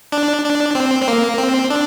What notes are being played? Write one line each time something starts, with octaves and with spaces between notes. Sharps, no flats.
D4
D4
C4
C4
A#3
C4
D4